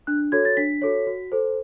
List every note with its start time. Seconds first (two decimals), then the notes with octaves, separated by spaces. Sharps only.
0.07 D4 F#6
0.32 F#4 A4 C#5 G#6
0.45 A6
0.57 D4 B6
0.82 F#4 A4 C#5
1.07 F#4
1.32 A4 C5